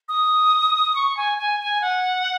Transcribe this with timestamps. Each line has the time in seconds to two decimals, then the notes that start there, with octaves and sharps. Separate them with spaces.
0.08 D#6
0.95 C#6
1.17 G#5
1.38 G#5
1.60 G#5
1.81 F#5